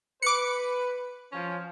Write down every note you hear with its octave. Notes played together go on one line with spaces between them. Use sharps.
B4 D6 C#7
F3 C#4